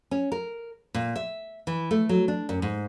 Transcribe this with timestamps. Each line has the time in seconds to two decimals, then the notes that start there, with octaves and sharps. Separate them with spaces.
0.11 C#4
0.32 A#4
0.95 A#2
1.16 E5
1.67 E3
1.91 A3
2.09 F#3
2.28 D4
2.49 F#2
2.62 G#2